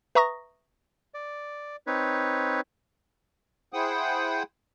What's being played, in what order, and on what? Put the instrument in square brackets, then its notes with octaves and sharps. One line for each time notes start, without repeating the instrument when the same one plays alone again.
[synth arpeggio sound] B4 E5 A#5 C#6 D#6 A#6
[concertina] D5
C4 D#4 B4 C#5
[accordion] E4 G#4 C5 F#5 G5 D#6